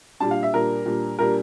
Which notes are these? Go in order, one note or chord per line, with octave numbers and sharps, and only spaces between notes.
A#2 G3 D4 A5
F5
E5
A#2 G3 D4 A#4
A#2 G3 D4
A#2 G3 D4 A#4